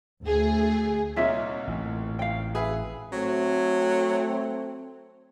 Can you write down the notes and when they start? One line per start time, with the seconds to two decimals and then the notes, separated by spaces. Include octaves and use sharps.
0.23 D2 A3 G#4
1.16 C2 A#2 D#4 F4 C#5 E5
1.67 A1 A2
2.19 F5 G5
2.55 G#4 B4 E5
3.12 F#3 A3 C4